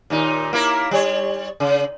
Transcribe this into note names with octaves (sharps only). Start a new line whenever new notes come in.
D#2 A#2 D#4
A#3 E4 A#4
G3 C#5
C#3